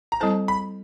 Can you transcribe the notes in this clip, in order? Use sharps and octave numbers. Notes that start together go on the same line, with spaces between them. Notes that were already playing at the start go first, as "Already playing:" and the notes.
A#5
G3 C4 E4 A4 C5 A5
B5